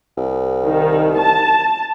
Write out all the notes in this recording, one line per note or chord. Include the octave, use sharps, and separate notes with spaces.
C2
D#3
A5